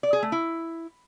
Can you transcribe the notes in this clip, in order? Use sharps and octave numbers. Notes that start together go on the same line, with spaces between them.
D5
G#4
A3
E4